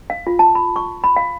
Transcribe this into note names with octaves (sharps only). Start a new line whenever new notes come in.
F5
F4
A5
B5
C#6
B5
F5